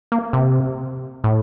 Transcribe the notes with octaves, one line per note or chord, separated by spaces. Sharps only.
A#3
C3
A2